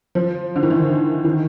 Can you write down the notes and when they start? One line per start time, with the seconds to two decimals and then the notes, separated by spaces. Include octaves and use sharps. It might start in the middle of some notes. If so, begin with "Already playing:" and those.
0.15 F3
0.56 D3
0.63 D#3
0.70 E3
1.25 D#3